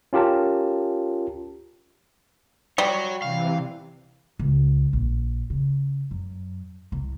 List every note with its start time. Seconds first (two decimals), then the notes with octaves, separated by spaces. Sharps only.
0.13 C#4 F4 G4 A#4 A5
2.78 G3 F#4 C#5
3.22 C3 E3 F5
4.39 C#2
4.93 A#1
5.50 C#3
6.11 F#2
6.92 C2